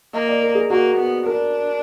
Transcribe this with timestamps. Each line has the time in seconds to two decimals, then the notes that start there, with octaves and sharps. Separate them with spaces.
0.13 A#3 D#5
0.28 D5
0.42 A#4
0.55 G#4
0.70 A#3 F#4
0.97 B3
1.26 D4 A#4